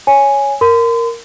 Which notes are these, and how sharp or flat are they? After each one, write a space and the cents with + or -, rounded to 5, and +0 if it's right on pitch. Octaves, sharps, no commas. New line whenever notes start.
C#5 +0 G#5 +0
A#4 -5 C6 -40